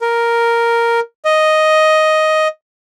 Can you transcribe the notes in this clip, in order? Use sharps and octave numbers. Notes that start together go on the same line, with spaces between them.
A#4
D#5